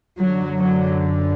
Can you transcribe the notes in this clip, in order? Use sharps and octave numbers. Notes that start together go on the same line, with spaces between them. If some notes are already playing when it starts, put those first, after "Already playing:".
F#2 D3 F#3
F#3